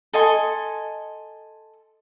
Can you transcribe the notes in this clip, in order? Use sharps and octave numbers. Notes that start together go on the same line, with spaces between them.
A4 D#5 G#5 C6